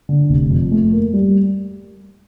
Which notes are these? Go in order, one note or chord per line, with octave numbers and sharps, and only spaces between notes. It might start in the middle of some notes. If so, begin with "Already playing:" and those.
D3
F1
F2
A3
A#3
G3